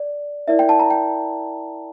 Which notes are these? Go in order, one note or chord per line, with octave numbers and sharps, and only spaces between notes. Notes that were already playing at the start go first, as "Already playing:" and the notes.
Already playing: D5
E4 A#4 D5 E5
G5
A5
A#5
G5